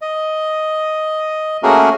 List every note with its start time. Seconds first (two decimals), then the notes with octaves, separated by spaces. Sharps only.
0.01 D#5
1.63 A3 A#3 C#4 F#4 G#4 A#4